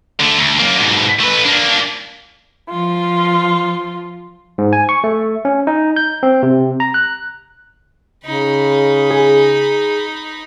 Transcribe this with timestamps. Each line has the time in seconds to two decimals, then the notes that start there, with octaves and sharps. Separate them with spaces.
0.20 D3 A3
0.38 D2
0.59 F#2 A#3
0.78 G#2 B2
1.20 A3 B4
1.45 A#3 D4
2.70 F3 F4
4.58 G#2
4.73 G#5
4.89 C#6
5.04 A3
5.45 C#4
5.67 D#4
5.96 G6
6.23 C4
6.43 C3
6.80 A#5
6.94 F#6
8.25 C#3 D#4 B5
9.11 G#4